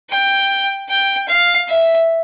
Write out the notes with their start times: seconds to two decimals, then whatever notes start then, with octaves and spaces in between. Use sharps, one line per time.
0.10 G5
0.89 G5
1.28 F5
1.69 E5